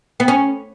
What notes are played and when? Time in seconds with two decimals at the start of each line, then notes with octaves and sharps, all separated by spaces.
0.20 B3
0.28 C#4